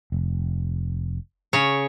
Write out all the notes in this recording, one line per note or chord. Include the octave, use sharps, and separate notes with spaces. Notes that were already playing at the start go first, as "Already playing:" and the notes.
F1
C#3 C#5